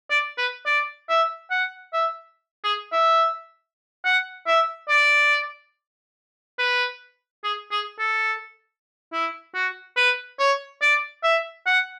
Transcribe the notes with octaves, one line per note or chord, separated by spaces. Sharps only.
D5
B4
D5
E5
F#5
E5
G#4
E5
F#5
E5
D5
B4
G#4
G#4
A4
E4
F#4
B4
C#5
D5
E5
F#5